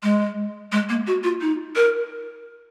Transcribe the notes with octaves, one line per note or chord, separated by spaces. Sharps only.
G#3
G#3
A#3
F#4
F4
D#4
A#4